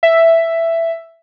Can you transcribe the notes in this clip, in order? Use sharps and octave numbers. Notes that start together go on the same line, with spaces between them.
E5